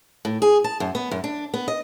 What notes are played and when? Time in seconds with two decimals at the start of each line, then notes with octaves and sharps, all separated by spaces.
0.25 A2
0.42 G#4
0.64 A5
0.80 F#2
0.95 B3
1.11 F#2
1.24 D4
1.54 B3
1.68 D#5